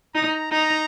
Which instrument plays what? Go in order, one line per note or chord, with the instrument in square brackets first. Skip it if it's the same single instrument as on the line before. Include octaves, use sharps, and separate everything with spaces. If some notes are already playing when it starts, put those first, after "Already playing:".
[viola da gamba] D#4 [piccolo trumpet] A#5
[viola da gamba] D#4 [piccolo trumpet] A#5